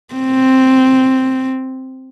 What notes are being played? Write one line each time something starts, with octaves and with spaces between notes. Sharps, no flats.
C4